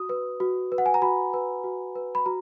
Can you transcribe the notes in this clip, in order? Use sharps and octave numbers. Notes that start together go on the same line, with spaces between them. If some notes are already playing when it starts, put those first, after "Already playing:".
Already playing: F#4 D#6
B4
F#4
B4
F#5
G#5
A#5
F#4 B5
B4
F#4
B4
B5
F#4 A#5